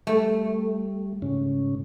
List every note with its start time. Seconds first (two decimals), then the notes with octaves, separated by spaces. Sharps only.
0.07 G3 A3
1.22 G#2 C#3 C#4